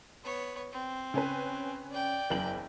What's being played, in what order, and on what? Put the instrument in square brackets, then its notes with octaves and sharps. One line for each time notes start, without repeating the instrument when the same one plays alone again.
[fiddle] B3 C#5
C4
[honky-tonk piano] C#3 C#4 B4
[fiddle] D5 G5
[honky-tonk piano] F#1 E2 F#7